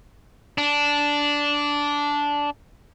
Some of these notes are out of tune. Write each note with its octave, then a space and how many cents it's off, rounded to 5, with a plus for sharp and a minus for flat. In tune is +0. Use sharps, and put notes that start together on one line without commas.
D4 -10